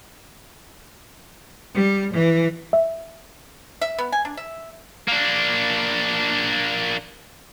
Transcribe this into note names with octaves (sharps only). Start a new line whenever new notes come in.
G3
E3
E5
E5
B3
G#5
D4
E5
A#3 D4